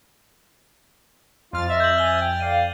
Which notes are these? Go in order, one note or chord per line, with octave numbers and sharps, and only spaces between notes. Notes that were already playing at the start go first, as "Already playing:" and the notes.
F2 F4 F6 A6
C#5 D#5 E5
G6 F#7
G#5 G7
G5
D5 F5 D#7